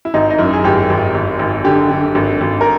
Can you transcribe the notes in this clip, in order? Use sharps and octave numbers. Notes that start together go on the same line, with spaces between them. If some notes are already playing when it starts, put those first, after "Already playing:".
E4
G#1 D#4
D#4
F#2 E4
G#4
G#1 G4
G#1
G#1
G#1
D3 G4
D3
G#1
G#1
A#4